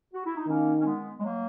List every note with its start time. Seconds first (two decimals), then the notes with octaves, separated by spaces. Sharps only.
0.13 F#4
0.25 E4
0.36 D#4
0.47 D#3 A#3 C#4
0.80 C#4
0.86 G#3 B3
1.19 G#3
1.24 F#3 A#3